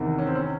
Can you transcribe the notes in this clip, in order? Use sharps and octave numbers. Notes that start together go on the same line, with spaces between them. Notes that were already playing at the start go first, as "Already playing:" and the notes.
Already playing: E2 C3 D#3
C#4
C4
C#4